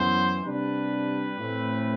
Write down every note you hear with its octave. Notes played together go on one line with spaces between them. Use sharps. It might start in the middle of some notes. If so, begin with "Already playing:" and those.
Already playing: F#2 E3 B3 C5
C3 G3 D4 B4
A2 E3 A3 C4 E4